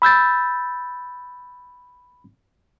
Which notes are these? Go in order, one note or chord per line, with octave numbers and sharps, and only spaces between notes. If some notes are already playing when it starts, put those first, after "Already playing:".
B5 E6 G6 A6